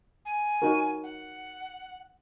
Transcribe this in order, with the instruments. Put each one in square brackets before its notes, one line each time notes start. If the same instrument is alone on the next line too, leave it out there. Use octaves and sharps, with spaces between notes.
[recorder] G#5
[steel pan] D#4 F#4 A#4
[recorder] F#5